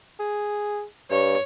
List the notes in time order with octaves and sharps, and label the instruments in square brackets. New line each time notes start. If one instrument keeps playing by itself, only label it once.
[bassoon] G#4
[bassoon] G2 [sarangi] C#5